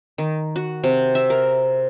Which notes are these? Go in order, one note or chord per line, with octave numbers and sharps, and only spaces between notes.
D#3
F#4
C3
E5
A#4